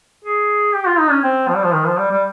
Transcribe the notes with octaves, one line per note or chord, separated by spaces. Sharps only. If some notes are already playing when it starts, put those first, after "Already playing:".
G#4
G4
F4
D#4
C#4
C4
F3
G3
F3
D#3
F3
G3
G3